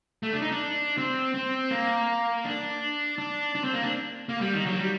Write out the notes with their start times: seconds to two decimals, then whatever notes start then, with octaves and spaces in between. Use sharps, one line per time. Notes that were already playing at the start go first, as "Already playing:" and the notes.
0.23 A3
0.33 D4
0.42 D#4
0.51 D4
0.98 C4
1.34 C4
1.71 A#3
2.45 D4
3.18 D4
3.55 D4
3.64 C4
3.74 A#3
3.83 D4
4.29 A#3
4.41 G3
4.54 D#3
4.66 F#3
4.79 G3